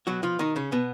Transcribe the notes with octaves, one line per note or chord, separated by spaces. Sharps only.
B2 F#3 F#4
F3 F4
D#3 D#4
C#3 C#4
B2 B3